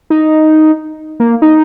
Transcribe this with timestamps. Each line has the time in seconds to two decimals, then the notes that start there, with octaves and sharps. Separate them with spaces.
0.10 D#4
1.20 A#3
1.42 D#4